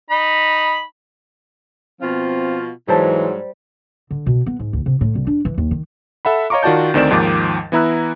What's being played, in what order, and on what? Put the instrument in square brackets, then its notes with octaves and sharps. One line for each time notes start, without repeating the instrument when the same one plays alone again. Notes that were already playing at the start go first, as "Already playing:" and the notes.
[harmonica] D#4 B5
[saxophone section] B2 F3 F4 [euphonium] C4
[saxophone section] G#2 F#3 [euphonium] E3 [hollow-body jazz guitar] G3 C5 A5
[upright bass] D3
B2
B3
G#2
D2
C3
A2
C2
D4
E3
D#2
D#3
[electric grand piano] A4 E5 F#5 B5
C#5 D#5 F5 A#5 C#6 D6
D#3 F4 F#4 D5 A5 G6
D2 D#3 C4 D5 E7
D#2 G#2 D#3 F3 D6 A6
E3 B3 E4 A#5 E6 F#6